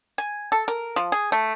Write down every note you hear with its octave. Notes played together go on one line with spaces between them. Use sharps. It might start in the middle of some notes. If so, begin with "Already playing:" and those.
G#5
A4
A#4
F3
G#4
A3